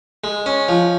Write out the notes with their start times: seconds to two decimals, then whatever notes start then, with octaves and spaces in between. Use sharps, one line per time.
0.24 G#3
0.46 C#4
0.69 F3